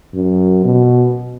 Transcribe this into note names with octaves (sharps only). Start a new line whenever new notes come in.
F#2
B2